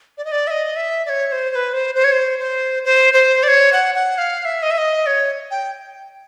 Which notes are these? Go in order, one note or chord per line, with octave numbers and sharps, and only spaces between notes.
D5
D#5
D5
E5
D#5
E5
D5
C#5
C#5
C5
C5
B4
C5
C5
C#5
C5
C5
C5
C5
D5
C#5
F#5
F#5
F5
F5
E5
D#5
E5
D#5
C#5
G5